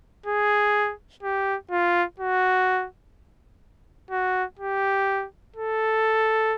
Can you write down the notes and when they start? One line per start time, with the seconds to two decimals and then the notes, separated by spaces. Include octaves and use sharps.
0.26 G#4
1.23 G4
1.71 F4
2.19 F#4
4.11 F#4
4.59 G4
5.56 A4